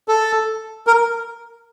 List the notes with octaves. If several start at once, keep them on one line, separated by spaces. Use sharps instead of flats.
A4
A#4